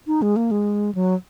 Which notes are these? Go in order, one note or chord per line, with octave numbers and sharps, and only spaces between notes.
D#4
G#3
A#3
G#3
F#3